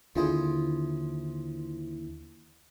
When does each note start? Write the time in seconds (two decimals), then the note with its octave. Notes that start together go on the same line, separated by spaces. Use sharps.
0.16 D#2 D3 F3 E4 G#4 C5